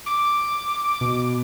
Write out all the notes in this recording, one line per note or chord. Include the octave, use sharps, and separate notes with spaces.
D6
B2